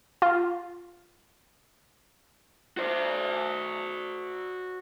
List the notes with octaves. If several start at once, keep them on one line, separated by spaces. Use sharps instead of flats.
F4
F#4 C5